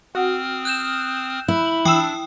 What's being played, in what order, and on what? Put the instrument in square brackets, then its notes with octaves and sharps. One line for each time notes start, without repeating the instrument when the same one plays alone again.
[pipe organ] C4 D#6 F6 [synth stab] F#4
[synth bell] F#6 G6 E7
[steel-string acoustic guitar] E4 [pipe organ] B5
[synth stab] E3 E6 [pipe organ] D4 [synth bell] G5 D#6